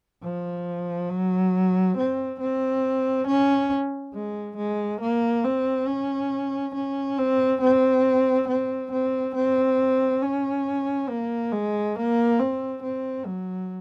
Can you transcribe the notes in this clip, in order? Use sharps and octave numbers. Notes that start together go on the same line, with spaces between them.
F3
F#3
C4
C4
C#4
G#3
G#3
A#3
C4
C#4
C#4
C4
C4
C4
C4
C4
C#4
A#3
G#3
A#3
C4
C4
F#3